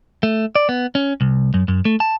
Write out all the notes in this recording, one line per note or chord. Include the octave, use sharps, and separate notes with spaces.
A3
D5
B3
C#4
C2
F#2
F#2
A3
A5